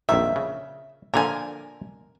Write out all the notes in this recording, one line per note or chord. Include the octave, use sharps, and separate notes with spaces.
A#1 F2 D#3 E5
C#3
A#2 D3 F3 A#4 G#5